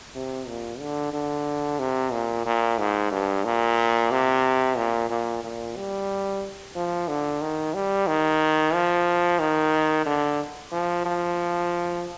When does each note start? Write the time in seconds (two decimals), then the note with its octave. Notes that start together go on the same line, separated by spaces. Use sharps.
0.15 C3
0.48 A#2
0.80 D3
1.13 D3
1.79 C3
2.12 A#2
2.45 A#2
2.78 G#2
3.11 G2
3.45 A#2
4.11 C3
4.77 A#2
5.10 A#2
5.43 A#2
5.77 G3
6.75 F3
7.08 D3
7.41 D#3
7.74 G3
8.07 D#3
8.73 F3
9.39 D#3
10.06 D3
10.72 F3
11.05 F3